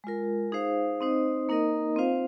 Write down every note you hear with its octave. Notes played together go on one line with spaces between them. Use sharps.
G#3 F4 A#4
D#4 G#4 C5 F5
C4 D#4 C5 D#5
A#3 D#4 A#4 D#5
C4 F4 C5 F5